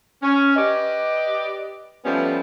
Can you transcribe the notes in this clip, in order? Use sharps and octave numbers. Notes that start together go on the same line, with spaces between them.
C#4
G4 B4 D5 D#5
F3 G3 A3 B3 C#4